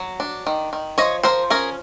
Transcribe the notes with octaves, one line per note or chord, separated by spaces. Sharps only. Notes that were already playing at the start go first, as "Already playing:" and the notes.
Already playing: F#3
D4
D#3
D#3
F3 C#5 D#5
F3 A#4 C5
C#4 G#4 A#4